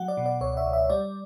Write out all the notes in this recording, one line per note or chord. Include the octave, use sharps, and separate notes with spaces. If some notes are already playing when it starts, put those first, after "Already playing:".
Already playing: F#3 F#5
D5
B2
D5
C#2 C#5
E5
C#2
E5
G3 D5